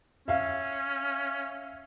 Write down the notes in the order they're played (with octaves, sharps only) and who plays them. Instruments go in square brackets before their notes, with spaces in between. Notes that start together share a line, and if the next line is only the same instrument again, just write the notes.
[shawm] C#4 [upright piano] E5 F5